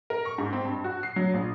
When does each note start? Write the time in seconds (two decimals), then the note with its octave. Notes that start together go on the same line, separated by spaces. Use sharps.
0.10 A#4
0.25 C#6
0.38 G#2
0.53 C4
0.65 G2
0.84 F#4
1.03 C7
1.16 F#3
1.34 A#1